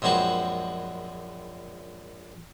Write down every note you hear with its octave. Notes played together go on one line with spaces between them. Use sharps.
A#1 F#2 G#3 C4 F#4 B4